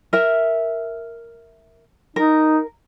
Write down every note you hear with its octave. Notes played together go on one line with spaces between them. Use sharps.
A#4 E5
D#4 A#4